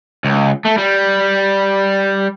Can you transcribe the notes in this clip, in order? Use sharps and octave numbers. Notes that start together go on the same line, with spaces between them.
C#2
A3
G3